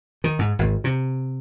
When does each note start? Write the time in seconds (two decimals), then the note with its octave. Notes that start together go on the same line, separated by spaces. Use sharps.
0.24 D#3
0.39 G#2
0.59 G#1
0.84 C3